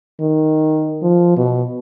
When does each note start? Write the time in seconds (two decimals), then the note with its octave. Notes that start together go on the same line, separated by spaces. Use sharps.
0.20 D#3
1.02 F3
1.36 B2